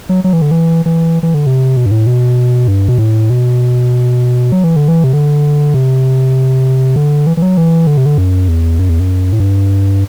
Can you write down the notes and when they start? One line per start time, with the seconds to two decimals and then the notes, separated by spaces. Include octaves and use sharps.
0.09 F#3
0.24 F#3
0.33 E3
0.42 D3
0.51 E3
0.86 E3
1.23 E3
1.34 D3
1.47 C3
1.76 B2
1.86 G2
1.91 A2
2.07 B2
2.68 G2
2.88 B2
2.98 A2
3.30 B2
4.52 F#3
4.64 E3
4.76 D3
4.88 E3
5.04 C3
5.13 D3
5.74 C3
6.96 D3
7.27 E3
7.37 E3
7.42 F#3
7.57 E3
7.87 D3
7.97 C3
8.06 D3
8.18 F#2
8.48 E2
8.79 F#2
8.89 E2
9.00 F#2
9.33 A2
9.40 G2